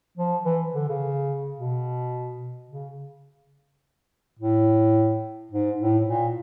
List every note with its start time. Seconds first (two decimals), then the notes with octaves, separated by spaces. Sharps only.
0.17 F3
0.45 E3
0.74 D3
0.88 C#3
1.58 B2
2.70 C#3
4.39 A2
5.51 G#2
5.79 A2
6.07 A#2